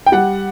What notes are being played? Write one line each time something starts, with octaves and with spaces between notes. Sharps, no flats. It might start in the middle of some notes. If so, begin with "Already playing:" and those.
G5
G3 F#5